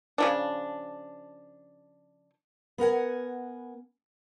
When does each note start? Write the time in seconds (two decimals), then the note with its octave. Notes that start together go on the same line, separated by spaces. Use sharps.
0.18 C#3 F3 D4
2.78 B3 A#4 F#5 G#5